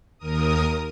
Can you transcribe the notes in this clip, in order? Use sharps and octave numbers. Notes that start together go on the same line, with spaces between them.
D#2 A#4 D#6